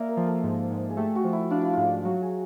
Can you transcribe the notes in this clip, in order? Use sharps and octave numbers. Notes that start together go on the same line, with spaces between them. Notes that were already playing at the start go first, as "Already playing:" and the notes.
Already playing: A#3 D5 E5
A#4
F3
A4
G#2
G#2
G#4
A3 G4
F#4
F3
E4
D4 F4
E4
G#2 F4
F#3 F#4
G#4